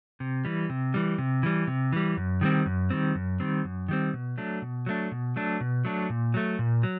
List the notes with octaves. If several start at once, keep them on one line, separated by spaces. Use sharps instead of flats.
C3
E3 G3
C3
E3 G3
C3
E3 G3
C3
E3 G3
F#2
D#3 G3 C4
F#2
D#3 G3 C4
F#2
D#3 G3 C4
F#2
D#3 G3 C4
B2
F#3 A3 D4
B2
F#3 A3 D4
B2
F#3 A3 D4
B2
F#3 A3 D4
A#2
F#3 A3
A#2
F#3